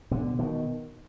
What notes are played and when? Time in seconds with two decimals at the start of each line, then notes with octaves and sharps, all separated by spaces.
0.11 B2 D3
0.39 B2 D#3